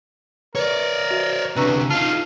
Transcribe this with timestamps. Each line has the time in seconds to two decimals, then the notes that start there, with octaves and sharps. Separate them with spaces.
0.55 A#4 B4 C#5 D5
1.11 F#4
1.56 D2 C3 D4 B4 A#5 C#6 E6 F#6
1.90 D#4 F4 F5 A5